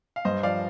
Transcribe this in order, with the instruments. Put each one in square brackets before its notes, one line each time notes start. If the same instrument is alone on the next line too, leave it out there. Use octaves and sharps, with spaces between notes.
[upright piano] F5
[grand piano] G2 [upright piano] C5 D#5
[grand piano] F3 [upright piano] D5 F5